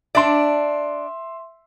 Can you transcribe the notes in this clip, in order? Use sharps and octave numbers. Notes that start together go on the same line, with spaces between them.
D4 D5 E5 C6